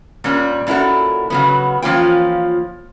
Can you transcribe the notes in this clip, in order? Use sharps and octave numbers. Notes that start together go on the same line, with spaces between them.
A#2 G3 C#4
A#2 C#4 E4 F#4 A4
C#3 F#3 B3
E3 F3 A#3 C#4 F4 G5